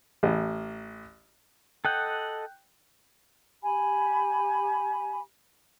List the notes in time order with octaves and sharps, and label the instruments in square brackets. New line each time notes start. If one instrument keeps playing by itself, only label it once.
[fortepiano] A1
[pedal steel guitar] A4 D#5 F#5 [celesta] G5 F#6 G6
[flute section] G4 G#5 B5